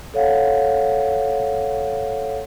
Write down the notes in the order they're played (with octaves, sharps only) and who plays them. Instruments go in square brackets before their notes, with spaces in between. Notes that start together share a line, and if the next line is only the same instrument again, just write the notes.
[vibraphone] A4 C#5 F5 F#5